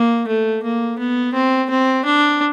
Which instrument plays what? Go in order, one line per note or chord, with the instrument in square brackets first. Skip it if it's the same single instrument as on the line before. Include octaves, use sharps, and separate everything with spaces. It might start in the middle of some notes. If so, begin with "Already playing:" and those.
Already playing: [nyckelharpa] A#3
A3
A#3
B3
C4
C4
D4